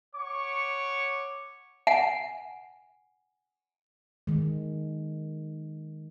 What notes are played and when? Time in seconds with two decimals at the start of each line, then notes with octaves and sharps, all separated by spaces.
0.15 C#5 F#5 C#6 D6
1.87 F#5 G#5
4.27 D#3 G#3